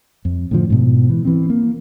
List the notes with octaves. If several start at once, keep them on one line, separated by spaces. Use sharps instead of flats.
F2
A2 D3 F3
G#2 B2
E3
E3 C4
A#3